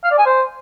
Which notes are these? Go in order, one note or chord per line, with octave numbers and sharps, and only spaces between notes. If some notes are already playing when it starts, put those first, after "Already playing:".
F5
D5
G#5
C5